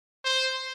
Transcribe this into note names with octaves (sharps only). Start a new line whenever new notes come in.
C5